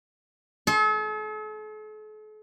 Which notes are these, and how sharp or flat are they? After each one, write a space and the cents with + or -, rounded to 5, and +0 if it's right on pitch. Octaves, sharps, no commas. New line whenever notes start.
A4 -45 C6 +35